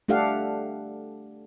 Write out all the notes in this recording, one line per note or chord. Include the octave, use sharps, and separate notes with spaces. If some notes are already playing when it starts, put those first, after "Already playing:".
A3 D4 G4 A4 F5 F#5